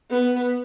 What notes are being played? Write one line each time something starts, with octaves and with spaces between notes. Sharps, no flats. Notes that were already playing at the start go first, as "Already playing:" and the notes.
B3